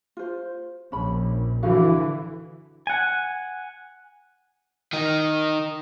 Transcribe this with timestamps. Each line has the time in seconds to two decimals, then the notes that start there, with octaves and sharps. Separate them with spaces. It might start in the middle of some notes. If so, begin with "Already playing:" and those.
0.17 F4 C5
0.92 A#1 C#4 B5
1.63 D3 E3 F#4 D#5 F5
2.87 F#5 G#5
4.93 D#3 D#4